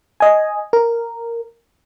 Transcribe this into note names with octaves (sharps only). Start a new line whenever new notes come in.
D#5 G#5
A#4